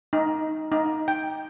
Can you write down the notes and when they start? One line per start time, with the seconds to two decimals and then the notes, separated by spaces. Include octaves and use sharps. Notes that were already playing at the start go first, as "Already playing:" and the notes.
0.13 D#4
0.72 D#4
1.08 G5